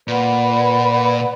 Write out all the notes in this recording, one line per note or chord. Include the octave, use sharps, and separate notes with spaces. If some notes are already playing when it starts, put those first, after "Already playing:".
A#2 B4 D5 F#5 B5